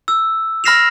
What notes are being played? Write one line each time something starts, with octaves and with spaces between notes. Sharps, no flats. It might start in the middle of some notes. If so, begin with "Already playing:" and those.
E6
B5 F6 A#6 C7 E7 F7